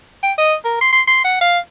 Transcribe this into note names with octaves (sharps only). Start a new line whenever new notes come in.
G5
D#5
A#4
C6
C6
C6
F#5
F5